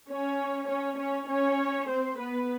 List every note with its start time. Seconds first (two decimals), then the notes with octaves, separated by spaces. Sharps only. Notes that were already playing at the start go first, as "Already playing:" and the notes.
0.10 C#4 C#5
0.69 C#4 C#5
0.99 C#4 C#5
1.28 C#4 C#5
1.89 C4 C5
2.19 B3 B4